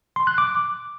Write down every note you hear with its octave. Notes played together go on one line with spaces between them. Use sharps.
C6
F#6
D6